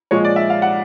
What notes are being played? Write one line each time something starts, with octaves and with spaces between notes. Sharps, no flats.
A#2 F3 G#3 C#5
D5
E5
F5
F#5